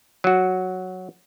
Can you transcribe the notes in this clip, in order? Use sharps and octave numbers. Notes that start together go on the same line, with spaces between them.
F#3 F#4